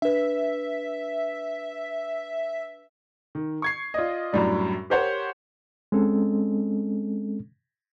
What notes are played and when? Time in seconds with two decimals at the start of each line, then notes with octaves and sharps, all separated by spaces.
0.02 D4 B4 E5
3.35 D#3
3.62 C#6 G#6 C7
3.94 F4 D5 D#5
4.33 F#2 A2 G3 D4
4.90 G4 A#4 C5 C#5 F#5
5.92 G#3 C4 C#4 A4